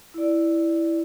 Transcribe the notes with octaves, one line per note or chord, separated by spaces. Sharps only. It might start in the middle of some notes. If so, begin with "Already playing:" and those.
E4 D5